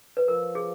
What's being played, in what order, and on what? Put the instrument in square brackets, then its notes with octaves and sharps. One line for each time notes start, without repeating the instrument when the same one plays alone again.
[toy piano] B4
[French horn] F3 [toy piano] A#4
[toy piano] G#4